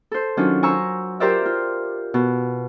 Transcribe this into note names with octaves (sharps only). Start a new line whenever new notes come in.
A4 C5
D#3 F#3 C#4 D4 F4
C5 G#5 A#5 C#6 E6
F4 G4 A#4 C5 D5 E5
F4
B2